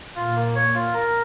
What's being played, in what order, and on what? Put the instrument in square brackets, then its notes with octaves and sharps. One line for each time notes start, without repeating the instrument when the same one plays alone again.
[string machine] A#2 [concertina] F4
[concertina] A#3
C#5
F4
A#4